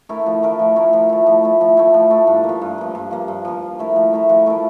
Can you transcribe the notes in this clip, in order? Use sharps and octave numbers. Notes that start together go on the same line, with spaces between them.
A3 E4 A#4
F3
A3 E4 A#4
F3
A3 E4 A#4
F3
A3 E4
F3
A3 E4
F3
A3 E4
F3
A3 E4
G2
A#3
F3
G2
F3 A#3
G2
F3 A#3
G2
F3 A#3
F3
A3 E4 A#4
F3
A3 E4 A#4
F3
A3 E4 A#4